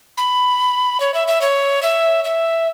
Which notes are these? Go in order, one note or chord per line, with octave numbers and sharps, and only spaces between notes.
B5
C#5
E5
E5
C#5
E5
E5